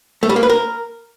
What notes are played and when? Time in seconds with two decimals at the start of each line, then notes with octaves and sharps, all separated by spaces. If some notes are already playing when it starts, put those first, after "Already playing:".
0.23 A3
0.29 G3
0.36 A#3
0.43 B4
0.49 A#4